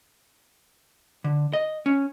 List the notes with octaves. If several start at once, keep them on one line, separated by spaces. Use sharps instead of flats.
D3
D#5
C#4